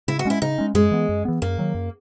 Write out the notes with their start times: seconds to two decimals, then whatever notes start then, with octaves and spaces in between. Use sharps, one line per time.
0.08 C#3 E4
0.19 F#4
0.25 G#3 C#4 E4
0.42 C#3 D#4
0.58 G#3 C#4
0.74 F#2 G#3
0.91 E3 B3
1.09 F#2
1.25 E3 B3
1.42 F#2 A#3
1.58 D#3 F#3
1.75 F#2